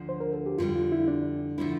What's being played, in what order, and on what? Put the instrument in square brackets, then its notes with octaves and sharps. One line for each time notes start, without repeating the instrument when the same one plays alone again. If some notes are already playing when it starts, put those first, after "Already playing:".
Already playing: [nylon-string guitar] D2 D3 F3
[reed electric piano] C5
A#4
A4
G4
[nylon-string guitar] F2 D3 G3 [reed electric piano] F4
[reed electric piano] F4
E4
D4
[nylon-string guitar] D3 F3 A3 E4